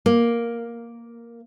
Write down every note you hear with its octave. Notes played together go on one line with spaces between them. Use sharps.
A#3